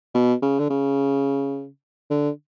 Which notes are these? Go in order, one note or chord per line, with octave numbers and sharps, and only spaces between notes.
B2
C#3
D3
C#3
D3